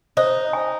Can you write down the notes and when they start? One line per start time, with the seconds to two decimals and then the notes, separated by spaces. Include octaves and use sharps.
0.17 D#4 C5
0.53 G#5